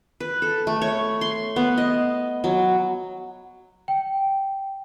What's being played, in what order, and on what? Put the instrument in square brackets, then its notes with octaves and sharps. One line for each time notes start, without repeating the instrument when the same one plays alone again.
[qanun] B4
A4
A3
C#5
C6
B3
D#5
F#3
[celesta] G5